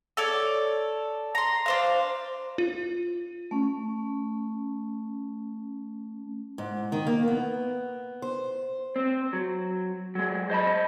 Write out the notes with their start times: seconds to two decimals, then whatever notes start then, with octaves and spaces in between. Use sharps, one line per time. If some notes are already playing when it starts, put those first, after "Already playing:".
0.17 A4 C#5 D5
1.35 A#5 C6
1.66 D4 C5 F5
2.58 F4
3.51 A3 C#4
6.58 G#2
6.92 D#3
7.07 A#3
7.28 B3
8.22 C5
8.96 C4
9.33 F#3
10.15 F#3 G#3
10.50 C5 D#5 A5 B5